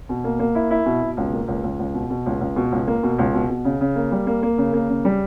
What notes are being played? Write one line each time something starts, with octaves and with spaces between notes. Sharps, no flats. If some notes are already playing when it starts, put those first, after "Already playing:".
B2
A#3
A#3
E4
E4
B2
B2
C#2
A#3
C#2
C#2
C#2
B2
B2
C#2
C#2
B2
C#2
A#3
B2
C#2
B2
B2
C#3
C#3
A#3
G3
A#3
A#3
C#3
A#3
C#3
G3